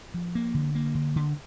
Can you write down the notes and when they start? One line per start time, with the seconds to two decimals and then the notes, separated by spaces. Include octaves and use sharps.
0.14 F3
0.35 A#3
0.54 D3
0.75 A#3
0.95 D3
1.16 D3